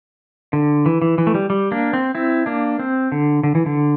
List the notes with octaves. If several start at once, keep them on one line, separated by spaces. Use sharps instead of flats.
D3
E3
E3
E3
A3
G3
G3
A#3 D4
C4
C4 E4
A#3 D4
C4
D3
D3
E3
D3